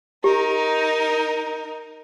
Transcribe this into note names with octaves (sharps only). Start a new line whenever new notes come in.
D#4 G4 A#4